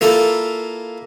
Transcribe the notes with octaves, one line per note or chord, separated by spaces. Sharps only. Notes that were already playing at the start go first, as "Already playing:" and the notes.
A#3 E4 F4 A4